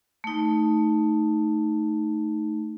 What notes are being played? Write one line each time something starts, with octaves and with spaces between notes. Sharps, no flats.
A3 D#4